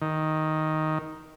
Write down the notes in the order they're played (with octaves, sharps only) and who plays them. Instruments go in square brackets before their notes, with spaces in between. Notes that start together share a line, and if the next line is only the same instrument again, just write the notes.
[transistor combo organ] D#3